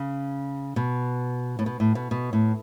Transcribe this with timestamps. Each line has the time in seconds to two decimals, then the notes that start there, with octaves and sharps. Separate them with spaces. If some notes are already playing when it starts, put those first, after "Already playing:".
Already playing: C#3
0.76 B2
1.59 A2
1.66 B2
1.80 A2
1.95 B2
2.11 B2
2.33 A2